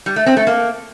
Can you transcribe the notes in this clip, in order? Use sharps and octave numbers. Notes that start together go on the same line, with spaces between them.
G3
A3
C4
A3
A#3